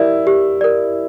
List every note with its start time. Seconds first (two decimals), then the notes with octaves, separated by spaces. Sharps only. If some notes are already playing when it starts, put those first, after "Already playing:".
Already playing: E4 G4 A#4 D5
0.27 G4
0.61 A#4 D5